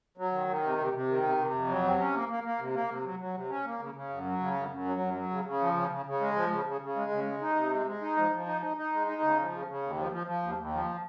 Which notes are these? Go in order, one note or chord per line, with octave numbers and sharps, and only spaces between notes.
F#3
D#3
D#3
C3
C3
C3
D#3
C3
C3
F2
F#3
C3
C#4
A#3
A#3
A#3
C3
A#3
C3
F#3
F#3
C3
C#4
A#3
C#3
C#3
F#2
F#3
C#3
F#2
F#2
F#3
F#2
F#3
C#3
C#3
F3
C#3
C#3
C#3
G#3
F3
C#3
C#3
C#3
G#3
C#3
G#3
D#4
C3
G#3
G#3
D#4
F3
F3
D#4
D#4
D#4
G#3
D#4
C#3
F3
C#3
C#3
D#2
F3
F3
F3
D#2
D#2
F3